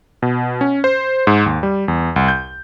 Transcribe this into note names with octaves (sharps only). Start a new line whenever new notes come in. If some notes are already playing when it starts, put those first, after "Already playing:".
B2
C#4
C5
G#2
D#2
G3
E2
C2
G6